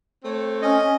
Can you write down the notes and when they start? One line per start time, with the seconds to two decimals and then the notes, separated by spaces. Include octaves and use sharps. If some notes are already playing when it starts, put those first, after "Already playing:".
0.24 A3 C4 C#5
0.62 C#4 D#5